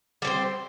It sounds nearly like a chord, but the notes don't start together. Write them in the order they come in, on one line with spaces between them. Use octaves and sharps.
G3 C4 C5